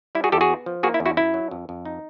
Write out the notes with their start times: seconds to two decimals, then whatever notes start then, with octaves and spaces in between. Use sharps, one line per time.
0.15 G3 E4
0.24 F#4 G#4
0.32 E2 G4 A4
0.41 F#4 G#4
0.50 B3
0.66 F3
0.83 A#3 F#4 G#4
0.94 E4
1.00 E2
1.06 E4 F#4
1.17 F#2 E4
1.34 F#3
1.51 F2
1.69 F2
1.85 D#4